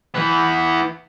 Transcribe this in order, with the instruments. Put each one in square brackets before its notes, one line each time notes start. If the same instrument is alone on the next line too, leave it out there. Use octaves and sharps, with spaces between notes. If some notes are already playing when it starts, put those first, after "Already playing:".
[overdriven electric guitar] E3 B3